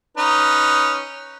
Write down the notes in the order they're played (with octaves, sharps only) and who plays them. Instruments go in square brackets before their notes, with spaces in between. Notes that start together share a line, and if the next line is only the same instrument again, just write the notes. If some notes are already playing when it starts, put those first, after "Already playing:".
[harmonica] C#4 D#4 B4